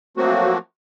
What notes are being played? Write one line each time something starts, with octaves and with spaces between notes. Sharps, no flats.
F3 F#3 A3 A#3 C4 F#4